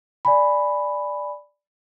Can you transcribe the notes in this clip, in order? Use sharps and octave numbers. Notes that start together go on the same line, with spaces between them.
D5 G#5 B5